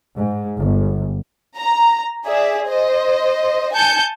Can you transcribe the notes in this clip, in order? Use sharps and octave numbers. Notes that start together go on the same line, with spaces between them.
G#2
G1
A#5
G#4 D5 E5
C5 D#5
G#5 A5 G6 C#7